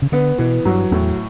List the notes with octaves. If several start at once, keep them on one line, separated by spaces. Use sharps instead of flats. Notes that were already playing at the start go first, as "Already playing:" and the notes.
C#3
D3 B3
B2 E3
G2 F#3
E2 A2